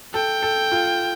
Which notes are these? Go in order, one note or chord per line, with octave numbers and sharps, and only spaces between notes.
A4 G5
A4
F4